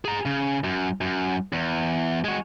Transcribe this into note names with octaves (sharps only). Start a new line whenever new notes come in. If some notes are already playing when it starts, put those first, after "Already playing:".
G#4 A#5
C#3
F#2
F#2
E2
G#3 F#4